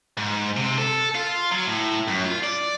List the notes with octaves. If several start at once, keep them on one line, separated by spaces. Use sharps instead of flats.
G#2
C3
A4
F4
F#3
A2
F#2
F4
D5